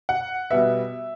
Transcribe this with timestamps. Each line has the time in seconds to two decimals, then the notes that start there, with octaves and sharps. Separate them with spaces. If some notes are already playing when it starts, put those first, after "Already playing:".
0.09 F#5
0.51 B2 G3 B3 E5